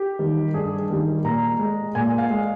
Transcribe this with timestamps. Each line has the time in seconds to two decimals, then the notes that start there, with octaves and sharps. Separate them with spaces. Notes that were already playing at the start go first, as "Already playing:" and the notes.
Already playing: G4
0.19 D#3 G3
0.54 G2 G#4
0.90 D#3 G3
1.24 A#2 A#5
1.59 G#3
1.95 A#2 G#5
2.18 F5
2.30 G#3